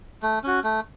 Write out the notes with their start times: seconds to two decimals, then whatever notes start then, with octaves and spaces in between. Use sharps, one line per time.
0.23 A3
0.44 C#4 F#4
0.64 A3